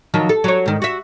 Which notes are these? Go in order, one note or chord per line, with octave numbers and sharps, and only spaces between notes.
D#3 F3 F#3
A4
F#3 C#5
G#2 D#3
F#4 E5